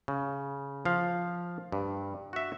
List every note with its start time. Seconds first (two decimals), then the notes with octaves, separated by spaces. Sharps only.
0.08 C#3
0.85 F3 F5
1.72 G2
2.33 F#4 E5